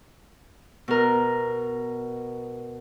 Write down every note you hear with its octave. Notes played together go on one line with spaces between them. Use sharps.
B2 A#4